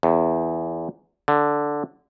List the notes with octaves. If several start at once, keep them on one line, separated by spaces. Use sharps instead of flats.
E2
D3